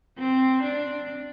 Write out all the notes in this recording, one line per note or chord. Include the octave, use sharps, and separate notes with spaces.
C4
D4